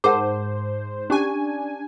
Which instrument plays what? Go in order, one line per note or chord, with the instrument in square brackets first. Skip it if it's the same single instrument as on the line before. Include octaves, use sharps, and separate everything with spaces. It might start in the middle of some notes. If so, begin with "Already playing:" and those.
[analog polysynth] G#2 C5 [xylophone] G#4 A#4 F#5 [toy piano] A5 D6
[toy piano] C#4 G4 [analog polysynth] D4 G#5